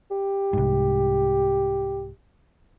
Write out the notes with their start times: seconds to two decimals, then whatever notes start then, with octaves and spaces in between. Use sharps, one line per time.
0.11 G4
0.53 C2 G#2